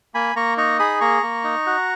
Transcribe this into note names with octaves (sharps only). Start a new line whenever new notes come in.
A#3 G#5 B5
A#3 A#5 C#6
D#4 A#5 C#6
G#4 B5 D#6
A#3 A#5 C#6
A#3
D#4
F#4